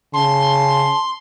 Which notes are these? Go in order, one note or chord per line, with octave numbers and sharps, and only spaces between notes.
C#3 A5 C6